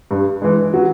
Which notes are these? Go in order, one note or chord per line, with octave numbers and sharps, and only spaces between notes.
G2
E3 G#3
F#3